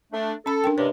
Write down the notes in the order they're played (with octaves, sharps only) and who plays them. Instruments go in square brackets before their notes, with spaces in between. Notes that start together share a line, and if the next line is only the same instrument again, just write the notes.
[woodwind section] A3 D4
[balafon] C#4 B5 [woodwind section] A4
[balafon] D4 A#4 G5
[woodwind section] G2 C3 G#3 [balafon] D4 B4 C#5